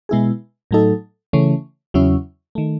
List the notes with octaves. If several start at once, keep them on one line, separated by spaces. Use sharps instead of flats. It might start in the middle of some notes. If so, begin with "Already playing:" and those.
B2 G#3 B3 E4 G#4
A2 F#3 A3 D#4 A4
C#3 E3 A3 C#4
E2 C#3 F#3 C#4 E4
D#3 A3